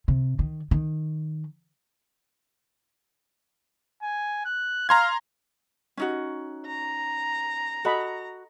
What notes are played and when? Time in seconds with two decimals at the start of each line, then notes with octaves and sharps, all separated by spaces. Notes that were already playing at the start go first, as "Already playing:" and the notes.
0.08 C3
0.39 D#3
0.71 D#3
4.02 G#5
4.45 F#6
4.89 F5 A#5 C6 G#6
5.97 C#4 D#4 F#4
6.67 A#5
7.85 F#4 A4 D#5 B5